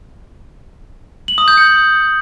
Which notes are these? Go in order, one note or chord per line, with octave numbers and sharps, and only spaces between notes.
F#7
D#6
G6
C#7